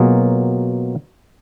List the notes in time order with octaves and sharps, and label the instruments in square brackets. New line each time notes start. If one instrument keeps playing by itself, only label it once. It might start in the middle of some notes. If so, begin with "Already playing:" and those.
Already playing: [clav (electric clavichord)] B2 F#3 A#3 F4 G#4